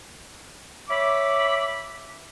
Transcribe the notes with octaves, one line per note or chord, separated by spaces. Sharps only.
C#5 E5 B5 D6